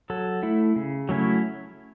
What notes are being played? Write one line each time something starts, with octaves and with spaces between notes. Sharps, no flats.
F#3 A4
A3 E4
C#3
F#3 A3 C#4 E4